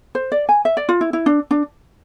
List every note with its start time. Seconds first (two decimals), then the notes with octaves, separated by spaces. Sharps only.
0.15 C5
0.32 D5
0.49 G#5
0.65 E5
0.77 D5
0.89 F4
1.01 E4
1.13 E4
1.26 D4
1.51 D4